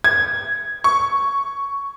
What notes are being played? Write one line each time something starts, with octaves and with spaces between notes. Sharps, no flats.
G#6
C#6